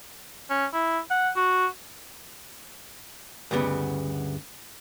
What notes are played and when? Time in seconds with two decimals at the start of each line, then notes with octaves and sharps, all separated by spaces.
0.50 C#4
0.73 E4
1.11 F#5
1.36 F#4
3.51 D2 G2 C#3 B3